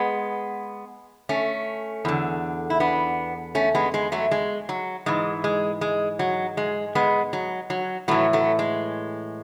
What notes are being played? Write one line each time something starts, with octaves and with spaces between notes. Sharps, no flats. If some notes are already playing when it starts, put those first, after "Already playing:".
Already playing: G#3 B3
A3 C#4
E2 D3
E4
B3 D4
A3 C#4
G#3 B3
G#3
F#3 A3
G#3
F#3
G#2 E3 G#3
G#3
G#3
F#3
G#3
G#3 B3
F#3
F#3
A2 E3 F#3 A3
F#3 A3
G#3